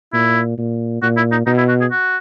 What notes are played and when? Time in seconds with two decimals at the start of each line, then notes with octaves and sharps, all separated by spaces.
0.13 A#2 E4
0.58 A#2
1.02 A#2 F#4
1.17 E4
1.31 D#4
1.46 B2 D#4
1.58 E4
1.68 F#4
1.81 G#4
1.91 F#4